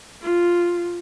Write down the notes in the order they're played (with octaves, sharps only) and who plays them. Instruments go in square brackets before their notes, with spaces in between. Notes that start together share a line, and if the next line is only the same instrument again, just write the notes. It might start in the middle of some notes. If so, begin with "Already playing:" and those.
[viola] F4